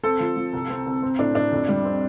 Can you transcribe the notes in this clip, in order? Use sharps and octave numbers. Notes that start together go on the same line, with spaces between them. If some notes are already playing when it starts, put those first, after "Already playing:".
C4 A4
F3
F3
C2
C4
C2
C4
A2 D4
A2 D4
F2
G3
C4